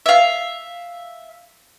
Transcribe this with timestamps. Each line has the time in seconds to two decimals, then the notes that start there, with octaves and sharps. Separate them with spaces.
0.06 E5 F5